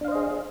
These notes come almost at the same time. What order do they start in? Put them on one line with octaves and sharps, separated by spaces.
D4 F5 C5 D#5 G#4